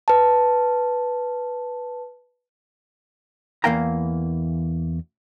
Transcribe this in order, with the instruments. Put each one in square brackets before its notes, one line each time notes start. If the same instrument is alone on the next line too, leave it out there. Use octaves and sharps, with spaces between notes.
[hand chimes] B4 A5
[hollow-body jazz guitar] E2 E3 A#3 F5 G5 A#5